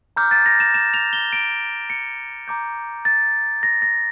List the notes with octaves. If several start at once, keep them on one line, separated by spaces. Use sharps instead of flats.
A#5 D6 F6 G6
A6
A#6
E7
E7
F7
G7
D7
C#7
A#5 D6 G6
A6
A#6
A#6